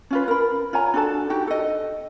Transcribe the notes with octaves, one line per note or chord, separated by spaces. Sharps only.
C#4 F4 B4
A#4 B5
F4 C#5 G#5 A#5
D4 F#4 A4 A5
D#4 F#4 G4 G5
A4 D#5